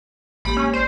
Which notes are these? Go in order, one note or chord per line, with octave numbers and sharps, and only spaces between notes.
A1 G#3 A#3 G4 B5
C#4
C5 D5